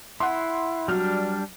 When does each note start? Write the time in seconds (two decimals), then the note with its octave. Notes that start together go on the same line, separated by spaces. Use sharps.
0.20 E4 F#5 C6
0.88 F#3 G3 D4 F6